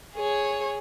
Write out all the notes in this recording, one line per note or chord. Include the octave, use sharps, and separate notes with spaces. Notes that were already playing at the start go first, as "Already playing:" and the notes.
G#4 C#5